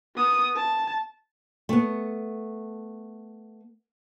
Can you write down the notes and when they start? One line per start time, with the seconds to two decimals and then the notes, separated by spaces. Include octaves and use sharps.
0.16 B3 D#6
0.55 A5
1.69 A3 B3